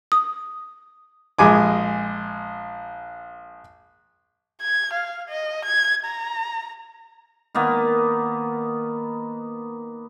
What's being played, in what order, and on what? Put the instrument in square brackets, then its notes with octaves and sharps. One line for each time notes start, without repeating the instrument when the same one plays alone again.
[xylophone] D#6
[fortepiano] A#1 G#3 G#5 D6
[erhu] G#6
F5
D#5
G#6
A#5
[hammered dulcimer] D#3 A#3 B3